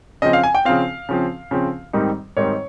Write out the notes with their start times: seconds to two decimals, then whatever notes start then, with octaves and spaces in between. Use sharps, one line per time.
0.22 C#3 F3 C4 D#5
0.33 F5
0.44 G#5
0.55 G5
0.65 C#3 F3 C4 F5
1.09 C#3 F3 C4
1.51 C#3 F3 C4
1.93 G#2 D#3 G3 C4 D#4
2.37 G#2 D#3 G3 C4 D#4 C#5